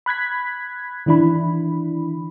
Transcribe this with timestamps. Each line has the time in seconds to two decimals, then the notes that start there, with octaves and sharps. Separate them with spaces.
0.06 B5 F#6 G#6 B6
1.06 D#3 E3 D4 E4 B5